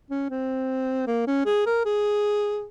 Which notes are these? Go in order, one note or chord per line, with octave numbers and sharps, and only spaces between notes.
C#4
C4
A#3
C#4
G#4
A#4
G#4